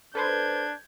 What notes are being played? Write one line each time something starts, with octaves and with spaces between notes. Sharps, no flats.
D4 A4 B4 C5 G6 G#6